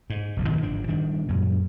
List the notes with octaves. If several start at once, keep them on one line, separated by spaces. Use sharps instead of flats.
G#2
F1 B1 E2
B2 D#3 E3 A#3
G1 G#2 F3 D4
D#3 G3 D4
F#2 A#2 F#3